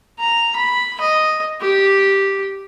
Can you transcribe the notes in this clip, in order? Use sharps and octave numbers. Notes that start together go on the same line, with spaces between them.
A#5
B5
D#5
G4